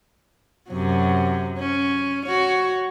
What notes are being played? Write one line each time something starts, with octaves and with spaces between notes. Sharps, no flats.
F#2 C3 F#3
C#4
F#4 C#5